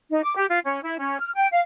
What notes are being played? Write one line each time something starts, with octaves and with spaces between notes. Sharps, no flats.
D#4
D6
G4
F4
C#4
E4
C#4
F6
G5
F5